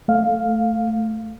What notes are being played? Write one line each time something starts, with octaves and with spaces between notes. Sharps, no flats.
A3 F5